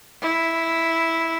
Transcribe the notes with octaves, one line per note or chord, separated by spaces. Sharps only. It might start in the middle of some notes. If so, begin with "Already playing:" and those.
E4